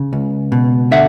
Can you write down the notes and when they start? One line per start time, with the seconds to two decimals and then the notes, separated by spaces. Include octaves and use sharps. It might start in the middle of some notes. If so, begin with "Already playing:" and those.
Already playing: C#3
0.13 C#2
0.52 B2
0.91 D3 E5 F#5